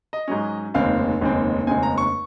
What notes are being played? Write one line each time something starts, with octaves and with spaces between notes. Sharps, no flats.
D#5
G#2 F#3 C#4
F1 D#2 C#3 G#3 C4 F5
F1 D#2 C#3 G#3 C4
F1 D#2 C#3 G#3 C4 G#5
A#5
C#6